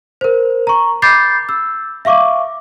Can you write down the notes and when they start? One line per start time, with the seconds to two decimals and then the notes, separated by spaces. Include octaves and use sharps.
0.21 A#4 C5
0.67 A#5 C#6
1.02 B5 D6 G6 A6 C7
1.49 E6
2.05 E5 F5 C#6 D6